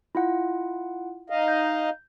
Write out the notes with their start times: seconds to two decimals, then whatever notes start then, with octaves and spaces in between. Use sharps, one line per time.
0.15 E4 F4 F#5
1.30 D#4 D#5 F5
1.48 G6